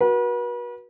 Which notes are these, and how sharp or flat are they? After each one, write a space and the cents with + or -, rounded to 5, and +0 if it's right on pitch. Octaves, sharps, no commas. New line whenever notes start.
F#4 +0 B4 -40